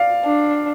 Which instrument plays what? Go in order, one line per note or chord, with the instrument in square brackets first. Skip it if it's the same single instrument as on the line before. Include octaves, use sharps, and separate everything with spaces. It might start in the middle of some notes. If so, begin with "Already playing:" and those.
Already playing: [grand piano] D5 F5
[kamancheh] D4